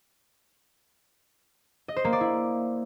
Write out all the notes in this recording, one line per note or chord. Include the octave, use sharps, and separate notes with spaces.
D#5
C5
A#3
D5
E4